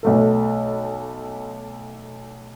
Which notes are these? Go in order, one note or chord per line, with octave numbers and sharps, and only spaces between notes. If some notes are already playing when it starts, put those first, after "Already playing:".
B1 A3 A4